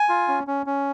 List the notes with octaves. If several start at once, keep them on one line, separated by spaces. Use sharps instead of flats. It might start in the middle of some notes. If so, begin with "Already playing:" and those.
Already playing: G#5
F4
C#4
C#4
C#4